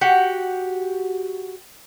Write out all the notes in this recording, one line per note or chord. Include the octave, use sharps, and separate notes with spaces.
F#4 G4 F#5